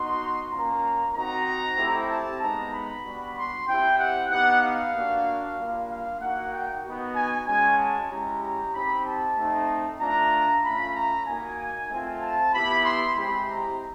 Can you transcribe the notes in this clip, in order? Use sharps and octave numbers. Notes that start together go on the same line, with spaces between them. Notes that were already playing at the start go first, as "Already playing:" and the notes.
Already playing: B3 D#4 F#4 C6
A#3 C#4 F4 A#5
C4 D#4 F#4 A#5
A3 C4 E4 G4
A5
G#3 B3 D#4 A#5
B5
G3 B3 D4 F#4
C6
C4 E4 G4 G5
F#5
B3 D#4 G4 F#5
F5
A#3 D4 F#4
G3 A#3 D4 F4
F5
A#3 D#4 F#4 F#5
G5
B3 D#4 F#4
G#5
G#3 C#4 F#4 G#5
A5
G#3 C#4 E4 G4 A#5
A#5
C4 D#4 G4 B5
A5
A3 C4 D#4
A3 D4 F4 A#5
A3 C#4 F4 B5
A#5
A#3 D#4 F#4 G#5
A3 C4 F4
A5
B3 E4 G4 B5
C6
G#3 C4 E4 G4 B5
A#5